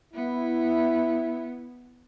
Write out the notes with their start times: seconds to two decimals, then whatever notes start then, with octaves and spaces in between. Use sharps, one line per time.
0.13 B3 E4